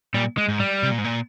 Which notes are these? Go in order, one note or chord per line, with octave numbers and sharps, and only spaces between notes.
A#2 G3
G#3
G#2
G3
C3
A#2
G#2
A#2